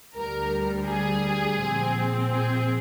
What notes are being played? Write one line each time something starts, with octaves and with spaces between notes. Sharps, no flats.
D2 D3 G3 A#4
G#4
A#2 F3 C4
G#4